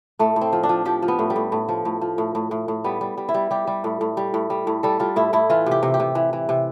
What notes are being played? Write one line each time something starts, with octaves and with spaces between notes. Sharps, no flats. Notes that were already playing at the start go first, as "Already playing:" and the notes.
A2 A3
A2
C4
F3
D4
F3
F3 G4
F3
B3
A2
G3
A2
A2
F3
A2
F3
A2
A2
A2
A2
G3 B3
G3
G3
E4
G3
G3 G4
G3
A2
A2
G3
A2
G3
A2
G3 A4
G3 F4
A2 E4
A2 E4
E3 F4
C3 G4
C3
G4
C3
E3
E3
C3